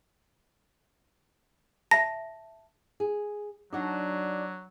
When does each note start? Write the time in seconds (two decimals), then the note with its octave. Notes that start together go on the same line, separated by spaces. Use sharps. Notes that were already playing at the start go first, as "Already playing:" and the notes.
1.91 E5 A5 A#6
3.00 G#4
3.73 F#3 D4 D#4 F#4 D5